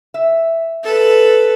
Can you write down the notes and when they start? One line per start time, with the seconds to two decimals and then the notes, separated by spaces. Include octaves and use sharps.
0.14 E5
0.84 A4 B4